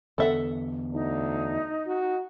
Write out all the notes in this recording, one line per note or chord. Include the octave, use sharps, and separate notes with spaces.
E2 D3 B3 A4 E5 F#5
D2 D#4
F#4